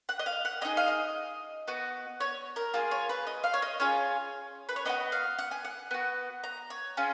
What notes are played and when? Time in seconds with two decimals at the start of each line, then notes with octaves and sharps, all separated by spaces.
0.09 F#5
0.19 D#5
0.26 F5
0.45 F#5
0.61 A#3 D#4 G#4 D#5
0.77 F5
0.88 D#5
1.68 B3 F#4
2.20 C#5
2.56 A#4
2.74 A#3 F4 G#4
2.91 C#5
3.09 B4
3.27 D#5
3.44 F5
3.54 C#5
3.62 D#5
3.80 C#4 F4 G#4 C#5
4.69 B4
4.76 C#5
4.85 B3 D#4 F#4 D#5
5.12 F5
5.39 F#5
5.51 G#5
5.65 F#5
5.91 B3 F#4
6.44 A#5
6.70 C#5
6.97 C#4 F4 G#4